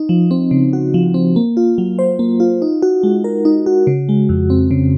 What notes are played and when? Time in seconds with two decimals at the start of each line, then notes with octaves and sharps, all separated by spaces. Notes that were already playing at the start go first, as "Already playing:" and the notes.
Already playing: D#4
0.09 F3
0.31 C4
0.51 C#3
0.73 F#4
0.94 F3
1.14 C4
1.36 A#3
1.57 F4
1.78 F#3
1.99 C5
2.19 A#3
2.40 F4
2.62 D#4
2.82 F#4
3.03 G#3
3.24 A#4
3.45 D#4
3.66 F#4
3.87 C#3
4.09 G#3
4.29 F2
4.50 C4
4.71 C#3